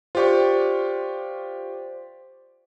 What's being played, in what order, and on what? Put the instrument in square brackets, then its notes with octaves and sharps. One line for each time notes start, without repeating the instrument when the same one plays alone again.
[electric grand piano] F4 G4 C#6 [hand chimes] C5 D5